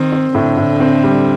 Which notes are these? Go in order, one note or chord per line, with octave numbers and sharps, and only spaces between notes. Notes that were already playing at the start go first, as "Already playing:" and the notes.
Already playing: D#3 C4
C4
A2 D3
A2
C4
G3